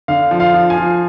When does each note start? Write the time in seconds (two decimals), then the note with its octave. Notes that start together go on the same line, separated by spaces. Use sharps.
0.08 D3 F5
0.31 F3
0.40 F5
0.54 F3
0.70 G#5
0.78 F3